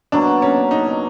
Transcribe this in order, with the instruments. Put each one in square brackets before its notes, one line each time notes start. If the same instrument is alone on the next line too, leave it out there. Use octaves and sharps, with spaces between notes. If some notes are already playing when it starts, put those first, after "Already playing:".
[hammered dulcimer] B2 F#3 A#3 [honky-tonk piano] D4
[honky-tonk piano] C#4
D#4